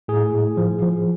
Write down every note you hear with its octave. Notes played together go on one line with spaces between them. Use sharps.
A2 G#4
A2
F3
F3